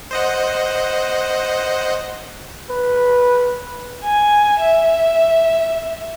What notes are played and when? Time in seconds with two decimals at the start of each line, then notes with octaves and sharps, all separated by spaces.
0.11 C5 D#5 F#5
2.70 B4
4.04 G#5
4.60 E5